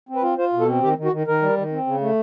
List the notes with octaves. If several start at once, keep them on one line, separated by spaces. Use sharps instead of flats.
C4
B4
F4
F4 C5
B2
A4
C4
D#3 G4
D#3
F#4
D#3
D#3 A#4
G3
D#3
C4
C#3
A3